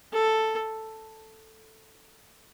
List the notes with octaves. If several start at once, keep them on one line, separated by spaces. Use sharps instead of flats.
A4